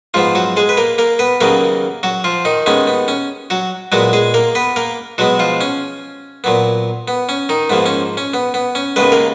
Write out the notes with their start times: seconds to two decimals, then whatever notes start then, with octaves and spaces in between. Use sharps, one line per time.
0.14 G#2 F3 B3 F4
0.35 F#3 F#4
0.57 G#3 G#4
0.69 B4
0.77 A#3 A#4
0.98 A#3 A#4
1.19 B3 B4
1.41 D#2 C#3 F#3 A#3 B3 A#4
2.03 F#3 F#4
2.24 F3 F4
2.45 D#3 D#4
2.66 D#2 D#3 G#3 B3 C#4
2.87 B3
3.08 C#4
3.50 F#3 F#4
3.92 A#2 F#3 G#3 B3 F#4
4.13 G#3 G#4
4.34 A#3 A#4
4.55 B3 B4
4.76 A#3 A#4
5.18 B2 F#3 G#3 B3 F#4
5.39 F3 F4
5.61 C#4
6.44 A#2 F#3 B3
7.08 B3
7.29 C#4
7.49 D#3 D#4
7.70 G#2 F3 A#3 B3
7.86 C#4
8.17 C#4
8.34 B3
8.54 B3
8.75 C#4
8.96 D#2 C#3 G#3 B3 B4
9.12 A#3 A#4